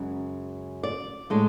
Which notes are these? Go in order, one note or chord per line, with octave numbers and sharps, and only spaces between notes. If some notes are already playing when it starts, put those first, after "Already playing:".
Already playing: F#2 C#3 G#3
D5
A2 G#3 D4